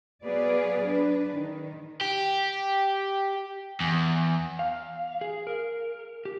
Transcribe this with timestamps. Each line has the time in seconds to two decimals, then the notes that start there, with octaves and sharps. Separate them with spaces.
0.24 F#3 B3 G#4 B4 D5 F5
0.85 D4 B4
1.33 D#3
2.01 G4
3.80 E2
4.59 F5
5.21 G#4
5.47 A#4
6.25 G4